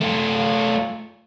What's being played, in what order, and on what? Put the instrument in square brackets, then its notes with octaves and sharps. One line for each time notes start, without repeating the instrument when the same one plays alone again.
[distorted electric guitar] A3 F4